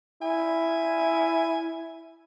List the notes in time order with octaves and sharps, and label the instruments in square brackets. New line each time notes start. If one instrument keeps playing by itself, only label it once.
[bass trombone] E4 [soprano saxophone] G#5